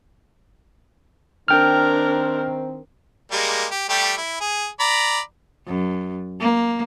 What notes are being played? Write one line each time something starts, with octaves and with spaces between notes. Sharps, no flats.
D#3 C4 D4 A#4 G5 F6
G3 G#3 A#3
G4
G3 A3 G4
E4
G#4
D5 A#5 B5
F#2
A#3